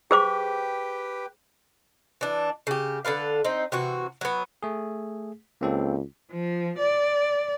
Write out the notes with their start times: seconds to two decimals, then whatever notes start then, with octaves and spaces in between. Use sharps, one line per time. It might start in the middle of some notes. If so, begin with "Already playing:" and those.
0.11 G4 G#4 B4 C5 G5 D6
2.21 E3 D4
2.67 C#3 G4
3.05 D3 A4 B4 F5
3.44 C4 D#4
3.72 C3 E3 F#4
4.21 F#3 B3
4.63 A3 G#4
5.61 C#2 A#3 C4 A4
6.32 F3
6.78 D5